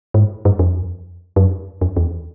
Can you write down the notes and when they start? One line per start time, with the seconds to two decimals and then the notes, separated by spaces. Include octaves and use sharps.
0.14 G#2
0.45 G2
0.59 F2
1.36 F#2
1.81 F2
1.97 E2